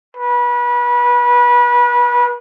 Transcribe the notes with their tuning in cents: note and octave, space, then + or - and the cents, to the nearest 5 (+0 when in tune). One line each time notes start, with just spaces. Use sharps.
B4 -30